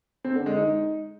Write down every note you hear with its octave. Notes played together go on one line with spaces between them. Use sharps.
C4
D3
G#3
D#4